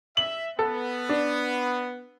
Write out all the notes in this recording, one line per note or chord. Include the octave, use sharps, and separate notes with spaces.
E5 F#7
B3 A4
D4